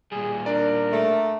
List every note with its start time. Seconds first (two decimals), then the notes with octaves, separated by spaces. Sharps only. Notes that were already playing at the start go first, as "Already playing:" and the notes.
0.12 A#2 G3 G#4
0.46 D4 A#4 D5
0.91 A3